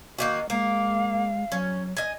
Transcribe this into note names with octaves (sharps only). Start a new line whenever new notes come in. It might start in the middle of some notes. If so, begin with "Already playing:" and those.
D#3 A#3 F#4 D#5
G#3 A#3 F5
F#3 C#4
D#5 G#5